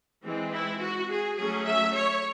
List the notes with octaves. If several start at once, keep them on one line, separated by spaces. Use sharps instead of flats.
E3 G#3 C4
E4
F#4
G#4
F#3 A3 C#4 G#4
E5
C#5